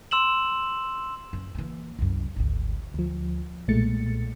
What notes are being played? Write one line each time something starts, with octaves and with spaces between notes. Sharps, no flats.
C6 E6 E7 F#7
F#2
E3 A#3
C2 F#2
G#1 D2
D2 F3
B1 A#2 G#3 A3 A6 C#7